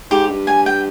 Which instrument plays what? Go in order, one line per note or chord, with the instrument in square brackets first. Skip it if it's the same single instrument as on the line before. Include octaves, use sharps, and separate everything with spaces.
[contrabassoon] G#2 [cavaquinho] G4
[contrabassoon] G2
[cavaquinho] G#5
G5